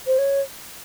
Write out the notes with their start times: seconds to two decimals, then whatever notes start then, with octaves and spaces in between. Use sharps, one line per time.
0.07 C5
0.18 C#5